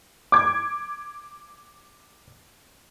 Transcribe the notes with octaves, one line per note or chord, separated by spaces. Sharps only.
D6 G#6